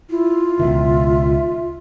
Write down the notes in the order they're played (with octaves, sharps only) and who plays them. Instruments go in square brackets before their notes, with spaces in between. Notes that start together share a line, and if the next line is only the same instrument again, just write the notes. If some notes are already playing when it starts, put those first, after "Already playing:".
[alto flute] E4 [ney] F4
[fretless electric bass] C#2 B2 D#3 [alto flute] E5